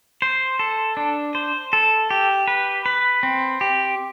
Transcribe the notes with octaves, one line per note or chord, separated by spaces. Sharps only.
C5
A4
D4
C5
A4
G4
B4
B4
C4
G4